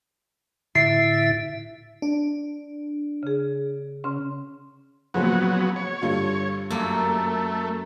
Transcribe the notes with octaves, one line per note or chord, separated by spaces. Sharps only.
A2 D3 E4 E5 C7
D4
C#3 G#4
C#3 C#4 C6
A#2 C#3 F3 F#3 B3
C#5
G2 D3 F4
F#2 A3 A#3